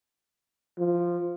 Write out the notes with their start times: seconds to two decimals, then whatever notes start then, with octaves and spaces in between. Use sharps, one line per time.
0.78 F3